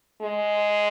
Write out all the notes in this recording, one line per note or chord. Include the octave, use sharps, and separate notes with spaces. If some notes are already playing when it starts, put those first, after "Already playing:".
G#3